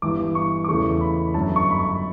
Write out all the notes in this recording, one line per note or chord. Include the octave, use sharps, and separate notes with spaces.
G1 G2 E3 D6
C#6
D6
E2 C#3 E3 A3 E4 C#6
B5
G1 F#2 D3 A5
C#6
B5
C#6